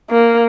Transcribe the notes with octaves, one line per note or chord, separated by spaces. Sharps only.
A#3